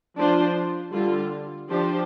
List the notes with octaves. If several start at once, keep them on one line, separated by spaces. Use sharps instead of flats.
F3 D4 F4 C5
D3 G3 F4
F3 D4 G4 C5